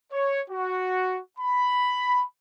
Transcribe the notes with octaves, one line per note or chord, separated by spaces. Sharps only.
C#5
F#4
B5